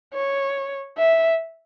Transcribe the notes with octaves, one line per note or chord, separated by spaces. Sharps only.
C#5
E5